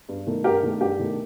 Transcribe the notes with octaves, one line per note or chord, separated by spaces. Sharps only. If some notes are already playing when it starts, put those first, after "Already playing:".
G2
D#3 A3
G2 G4 A#4
D#3 A3
G2 G4
D#3 A3